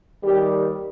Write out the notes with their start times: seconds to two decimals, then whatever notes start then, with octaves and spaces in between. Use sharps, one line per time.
0.23 D#2 D#3 G3 G4